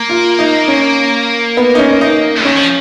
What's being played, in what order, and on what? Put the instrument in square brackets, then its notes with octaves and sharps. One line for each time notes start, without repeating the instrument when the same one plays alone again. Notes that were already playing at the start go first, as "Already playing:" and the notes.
Already playing: [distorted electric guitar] A#3
[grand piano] F4
D#4
C#4
B3
D#4
C#4
D#4
[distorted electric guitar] D#3 [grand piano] C#4
[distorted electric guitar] F3